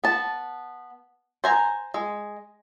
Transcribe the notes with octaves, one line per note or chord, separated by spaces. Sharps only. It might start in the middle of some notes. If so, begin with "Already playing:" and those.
B3 A5
C5 G#5 A#5
G#3